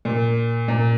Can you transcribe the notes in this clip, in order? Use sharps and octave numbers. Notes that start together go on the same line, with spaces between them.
A#2
A#2